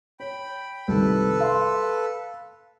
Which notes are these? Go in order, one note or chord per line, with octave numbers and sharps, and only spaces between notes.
C#5 G5 B5
C2 D#3 A4 B4
F5 C6